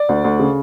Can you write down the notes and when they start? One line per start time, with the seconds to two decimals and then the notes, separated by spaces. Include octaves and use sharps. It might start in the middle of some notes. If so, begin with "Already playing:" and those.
Already playing: D5
0.09 D2
0.24 D2
0.39 C#3